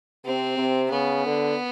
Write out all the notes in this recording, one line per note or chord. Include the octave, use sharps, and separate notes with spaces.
C3 C4
C3
C#3 B3
D3